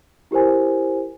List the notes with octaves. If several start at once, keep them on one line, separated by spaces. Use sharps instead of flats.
E4 G4 A#4 C5 G#5